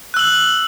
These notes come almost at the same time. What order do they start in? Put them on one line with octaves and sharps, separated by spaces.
F#6 E6 F#7